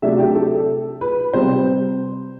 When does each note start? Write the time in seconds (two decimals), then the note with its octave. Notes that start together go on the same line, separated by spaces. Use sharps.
0.02 C3 F#3 A3 D4 E5
0.19 G4
0.35 A4
1.01 B4
1.33 C3 G3 C4 C5